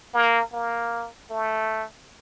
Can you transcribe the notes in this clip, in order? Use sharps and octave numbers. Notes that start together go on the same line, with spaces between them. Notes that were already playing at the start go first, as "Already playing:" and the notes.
A#3
A#3
A3